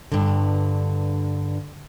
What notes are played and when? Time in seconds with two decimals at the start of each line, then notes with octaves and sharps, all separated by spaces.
0.12 G2 D3